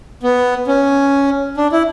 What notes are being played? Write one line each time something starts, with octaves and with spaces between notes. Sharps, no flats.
B3
C#4
D4
E4